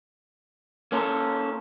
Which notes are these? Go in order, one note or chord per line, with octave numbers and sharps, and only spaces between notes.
A#3 C#4 F4 A4 A#4